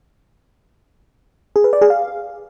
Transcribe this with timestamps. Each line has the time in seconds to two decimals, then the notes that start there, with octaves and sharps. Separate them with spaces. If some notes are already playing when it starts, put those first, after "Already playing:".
1.56 G#4
1.64 B4
1.73 D5
1.81 G#4
1.90 F5